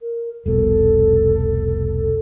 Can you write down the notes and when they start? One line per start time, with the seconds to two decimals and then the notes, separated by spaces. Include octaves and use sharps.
0.02 A#4
0.46 F1 C2 B2 A4